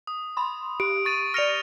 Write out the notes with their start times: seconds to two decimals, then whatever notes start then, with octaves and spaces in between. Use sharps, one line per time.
0.07 D#6
0.37 B5 C6
0.80 G4 D7
1.05 C#6 A6 D#7
1.34 D5 F6 A#6 C#7 F7